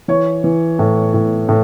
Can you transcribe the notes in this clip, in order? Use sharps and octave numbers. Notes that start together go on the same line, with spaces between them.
E3 C#5
E3
A2
A2
A2